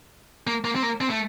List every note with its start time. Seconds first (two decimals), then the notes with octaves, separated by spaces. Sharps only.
0.47 A#3
0.65 A#3
0.76 C4
0.83 A#3
1.01 C4
1.10 A3